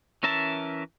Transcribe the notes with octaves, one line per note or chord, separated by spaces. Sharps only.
E3 C#4 A#4 E5 A5